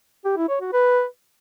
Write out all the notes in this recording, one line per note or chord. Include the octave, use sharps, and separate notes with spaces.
G4
E4
C#5
F#4
B4